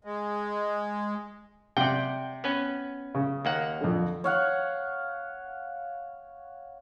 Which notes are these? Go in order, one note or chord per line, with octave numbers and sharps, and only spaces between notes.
G#3
C3 D5 F#5 G5
B3 C#4 B4
C#3
D#2 A#3 F#5
F2 D3
C#5 F5 F#5